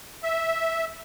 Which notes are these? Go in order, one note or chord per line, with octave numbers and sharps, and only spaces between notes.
E5